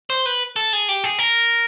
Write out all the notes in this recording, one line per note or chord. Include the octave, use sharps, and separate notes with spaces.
C5
B4
A4
G#4
G4
G#4
A#4